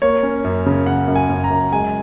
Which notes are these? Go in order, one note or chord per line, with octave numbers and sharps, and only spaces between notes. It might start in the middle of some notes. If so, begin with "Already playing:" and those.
A#3 C#5
C#4
F#2
C#3
C#3 F#5
F#2
G#5
F#2
A#5
F#2
G#3 G#5